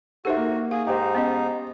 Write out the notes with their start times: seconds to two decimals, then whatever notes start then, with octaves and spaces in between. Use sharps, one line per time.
0.25 D#4 F#4 G4 A4 C5 E5
0.37 A#3
0.71 G#4 F5
0.87 G#2 D#4 G4 C5
1.15 B3 C#4 D#5